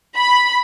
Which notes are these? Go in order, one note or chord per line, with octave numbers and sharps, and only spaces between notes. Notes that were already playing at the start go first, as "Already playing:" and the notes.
B5